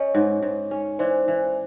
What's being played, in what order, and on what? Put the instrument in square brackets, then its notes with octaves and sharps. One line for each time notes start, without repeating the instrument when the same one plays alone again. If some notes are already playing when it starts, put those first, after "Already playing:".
Already playing: [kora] C#4 [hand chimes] C#5 D#5
[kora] G#2
G#2
C#4
[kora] E3 [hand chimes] C5 D5
[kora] E3